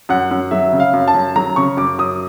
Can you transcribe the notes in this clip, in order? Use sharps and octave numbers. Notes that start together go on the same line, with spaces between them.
F#2 F#5
F#2
F#3 E5
C#3
F5
F#2
A5
F#2
F#3 A#5
C#3 C#6
F#2 D6
F#2 D#6